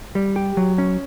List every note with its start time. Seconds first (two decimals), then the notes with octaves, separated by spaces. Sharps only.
0.15 G3
0.36 G4
0.57 F#3
0.78 C#4